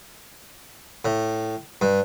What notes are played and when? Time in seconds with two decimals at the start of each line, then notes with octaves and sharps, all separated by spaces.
1.05 A2
1.81 G2